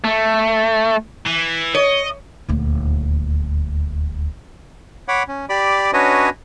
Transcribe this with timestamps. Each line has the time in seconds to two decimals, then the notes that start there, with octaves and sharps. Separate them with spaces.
0.04 A3
1.26 E3
1.75 C#5 D#5
2.49 D#1 D2
5.08 C#5 F#5 B5 D6
5.28 C#4
5.49 G4 D5 B5 D6
5.93 C#4 D4 F#4 B4 C#5 D#5